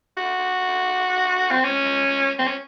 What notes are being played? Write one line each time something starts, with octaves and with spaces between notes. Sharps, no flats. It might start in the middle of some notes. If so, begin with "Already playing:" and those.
F#4
C4
C#4
C4
C#4